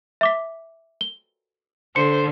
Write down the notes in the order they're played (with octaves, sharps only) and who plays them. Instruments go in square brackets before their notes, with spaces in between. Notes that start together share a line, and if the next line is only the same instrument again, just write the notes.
[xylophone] E5 D6 B6
G7
[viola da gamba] D3 [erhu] C5 [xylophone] C#7